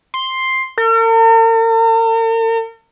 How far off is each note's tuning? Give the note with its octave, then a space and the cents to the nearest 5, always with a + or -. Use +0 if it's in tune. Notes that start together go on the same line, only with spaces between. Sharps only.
C6 +5
A#4 -45